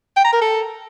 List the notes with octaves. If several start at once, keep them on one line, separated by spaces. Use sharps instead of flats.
G5
A#5
A#4
A4